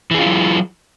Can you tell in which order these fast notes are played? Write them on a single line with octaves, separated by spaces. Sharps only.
E3 G#4 F4 E4 F#3